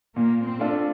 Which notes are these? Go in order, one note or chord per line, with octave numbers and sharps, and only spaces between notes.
A#2 A#3
C4
A3 D4 F4 A4